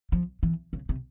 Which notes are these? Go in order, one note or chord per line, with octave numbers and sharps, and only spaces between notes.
F3
E3
C#3
C3